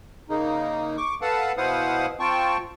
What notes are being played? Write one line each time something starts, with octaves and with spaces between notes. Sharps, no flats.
C#3 A#3 D#4
C#6 D6
A4 B4 F5 F#5 A5
B2 E4 C5 F5 F#5 D#6
C4 F4 G5 A5 C#6